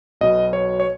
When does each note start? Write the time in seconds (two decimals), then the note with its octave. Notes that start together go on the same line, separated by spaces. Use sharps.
0.21 B1 B2 D#5
0.53 C#5
0.80 C#5